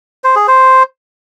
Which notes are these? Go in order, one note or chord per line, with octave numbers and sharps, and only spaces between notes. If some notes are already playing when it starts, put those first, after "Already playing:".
C5
G#4
C5